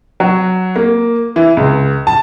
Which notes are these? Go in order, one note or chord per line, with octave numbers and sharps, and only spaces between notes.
F#3
A#3
E3
C#2
A5